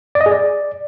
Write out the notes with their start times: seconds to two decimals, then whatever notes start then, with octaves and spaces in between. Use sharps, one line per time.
0.15 D5
0.21 D#5
0.26 G#4
0.31 D5